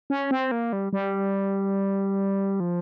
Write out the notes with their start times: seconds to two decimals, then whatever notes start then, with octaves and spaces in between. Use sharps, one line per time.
0.10 C#4
0.31 C4
0.51 A#3
0.73 G3
0.93 G3
2.60 F3